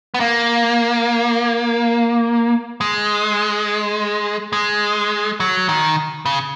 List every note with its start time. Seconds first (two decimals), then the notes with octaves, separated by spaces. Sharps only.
0.14 B3
0.20 A#3
2.81 G#3
4.53 G#3
5.40 F#3
5.69 D#3
6.26 C#3